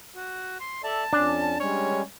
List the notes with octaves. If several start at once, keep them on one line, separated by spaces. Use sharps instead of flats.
F#4
C6
A4 D5 E5 A5
F2 C#4 D4
G3 G#3 C#4 C#5